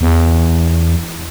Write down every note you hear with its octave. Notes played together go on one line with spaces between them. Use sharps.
E2